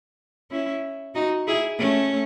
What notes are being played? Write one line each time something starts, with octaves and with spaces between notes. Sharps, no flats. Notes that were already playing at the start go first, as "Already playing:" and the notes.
C#4 E4
D#4 F#4
E4 G#4
A3 C#4